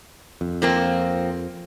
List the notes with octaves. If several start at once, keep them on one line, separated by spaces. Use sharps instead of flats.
F2
F3 A#3 C4